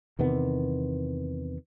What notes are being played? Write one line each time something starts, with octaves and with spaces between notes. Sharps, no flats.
E2 C3 D#3 B3